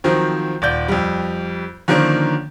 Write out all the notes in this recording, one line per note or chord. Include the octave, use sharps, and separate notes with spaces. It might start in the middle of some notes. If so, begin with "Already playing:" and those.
D#3 F3 F#3 C4
D#1 D5 G6
F2 G3
D3 D#3 F3 A#3 C#4 D4